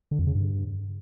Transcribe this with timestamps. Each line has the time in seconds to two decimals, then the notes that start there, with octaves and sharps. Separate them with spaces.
0.11 D3
0.19 F2
0.27 C#3
0.35 G2